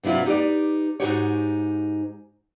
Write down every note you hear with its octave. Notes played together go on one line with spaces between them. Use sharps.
G2 C3 F#3 E4 F4
D#4 G4 B4 D5
G#2 C3 D#4 F#4 G4 C#5